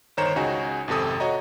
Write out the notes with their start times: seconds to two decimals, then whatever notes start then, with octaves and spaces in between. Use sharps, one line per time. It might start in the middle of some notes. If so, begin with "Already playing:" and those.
0.17 G1 D#3 C5 C#5 A#5 E7
0.36 C#2 C#3 D#4 F#4 G#5
0.88 G#1 F2 C3 A4 D#6
1.20 F#4 C#5 D#5 A#5